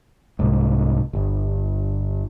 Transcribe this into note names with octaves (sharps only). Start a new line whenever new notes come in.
C2 G#2
G1